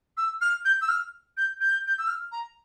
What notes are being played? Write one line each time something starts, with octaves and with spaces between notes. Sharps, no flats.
E6
F6
G6
E6
F6
G6
G6
G6
E6
F6
A#5